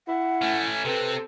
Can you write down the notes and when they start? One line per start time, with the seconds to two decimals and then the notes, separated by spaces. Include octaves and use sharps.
0.08 E4 F#5
0.42 A3 C#4
0.85 C3 C4 A4 B4